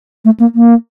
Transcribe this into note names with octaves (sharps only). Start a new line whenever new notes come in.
A3
A#3
A#3